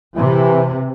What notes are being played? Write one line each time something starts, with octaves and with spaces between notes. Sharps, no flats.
C3 E3